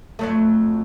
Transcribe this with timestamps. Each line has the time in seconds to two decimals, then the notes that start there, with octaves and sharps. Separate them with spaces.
0.19 F2 F#3 A3